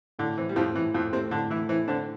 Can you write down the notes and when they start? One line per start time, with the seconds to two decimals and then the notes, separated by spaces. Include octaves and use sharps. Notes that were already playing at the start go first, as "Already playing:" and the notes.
0.19 A2 D3
0.38 E3 C4
0.49 G3
0.56 F2 A2 F3
0.75 A2 E3
0.94 F2 A2 F3
1.12 C3 A3 C4
1.31 A2 D3 D4
1.50 E3 A3 E4
1.69 E3 C4 E4
1.88 D3 C4 D4